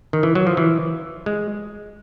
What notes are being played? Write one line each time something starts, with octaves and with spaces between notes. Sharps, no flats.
D#3
E3
F#3
F3
E3
G#3